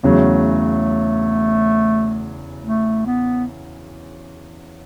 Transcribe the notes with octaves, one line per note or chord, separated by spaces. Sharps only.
E2 C#3 F#3 A3
A3
B3